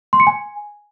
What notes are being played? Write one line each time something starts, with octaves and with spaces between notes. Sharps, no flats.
C6
C#7
G#5